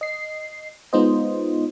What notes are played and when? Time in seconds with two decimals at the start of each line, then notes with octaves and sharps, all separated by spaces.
0.01 D#5 C7
0.93 G#3 B3 D#4 F4 C5 D#5